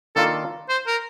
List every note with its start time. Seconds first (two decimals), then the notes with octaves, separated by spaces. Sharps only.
0.16 D#3 A#3 D4 F4 A4 A#4
0.69 C5
0.87 A#4